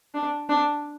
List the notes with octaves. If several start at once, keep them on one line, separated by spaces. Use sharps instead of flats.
D4
D4